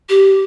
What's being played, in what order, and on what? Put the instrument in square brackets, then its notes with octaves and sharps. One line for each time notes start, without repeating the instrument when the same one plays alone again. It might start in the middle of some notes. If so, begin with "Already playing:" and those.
[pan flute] G4